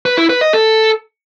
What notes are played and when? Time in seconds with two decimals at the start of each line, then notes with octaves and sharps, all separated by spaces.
0.06 B4
0.18 E4
0.29 B4
0.41 D#5
0.53 A4